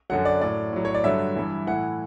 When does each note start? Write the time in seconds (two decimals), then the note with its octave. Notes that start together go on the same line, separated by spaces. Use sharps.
0.10 F#2 D3 F#3 F#5
0.25 D5
0.41 A2 F#3 D5
0.73 A2 F#3
0.85 C#5
0.94 D5
1.04 G2 D3 F#3 E5
1.36 G2 E3
1.67 A2 E3 F#5